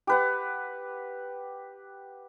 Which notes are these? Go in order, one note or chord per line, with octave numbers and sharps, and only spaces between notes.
G4 B4 F#5